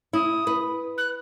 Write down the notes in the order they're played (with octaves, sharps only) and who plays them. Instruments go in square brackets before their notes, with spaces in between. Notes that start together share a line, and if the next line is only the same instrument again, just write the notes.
[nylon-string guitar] E4 [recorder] D#6
[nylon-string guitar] B4
[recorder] F#6